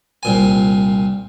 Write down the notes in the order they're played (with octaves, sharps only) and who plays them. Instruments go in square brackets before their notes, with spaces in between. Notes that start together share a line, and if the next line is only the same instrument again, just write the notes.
[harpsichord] C2 A#2 G#5